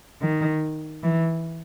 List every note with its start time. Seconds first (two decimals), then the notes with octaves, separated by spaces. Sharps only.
0.22 D#3
1.03 E3